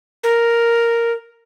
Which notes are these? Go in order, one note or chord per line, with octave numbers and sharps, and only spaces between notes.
A#4